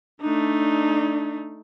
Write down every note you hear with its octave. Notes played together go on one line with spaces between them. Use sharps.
A3 D4 D#4